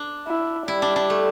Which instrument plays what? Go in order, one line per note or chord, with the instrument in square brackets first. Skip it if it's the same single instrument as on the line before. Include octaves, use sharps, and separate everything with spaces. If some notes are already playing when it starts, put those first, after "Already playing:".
Already playing: [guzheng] D4
[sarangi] E4
[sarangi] G3 [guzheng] E4
[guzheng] D4
D4
A3